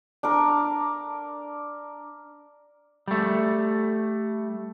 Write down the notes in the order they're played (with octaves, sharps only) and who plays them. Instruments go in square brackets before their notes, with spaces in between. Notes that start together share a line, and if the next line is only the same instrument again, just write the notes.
[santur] D4 A#4
[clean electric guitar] G3 A3